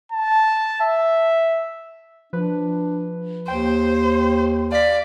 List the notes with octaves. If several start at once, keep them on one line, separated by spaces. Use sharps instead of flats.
A5
E5
F3 D4 B4
D#2 C5 G5
D5 F5 B6